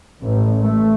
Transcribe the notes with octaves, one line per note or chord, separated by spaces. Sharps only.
A1
A3